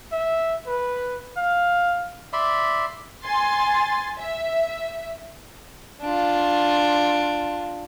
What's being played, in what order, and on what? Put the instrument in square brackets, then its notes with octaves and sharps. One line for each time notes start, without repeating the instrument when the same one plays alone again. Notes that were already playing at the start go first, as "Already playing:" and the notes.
[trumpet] E5
B4
[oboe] F5
[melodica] D5 E5 B5 C6
[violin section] G#5 C6 A6
E5
[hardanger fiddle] D4 F4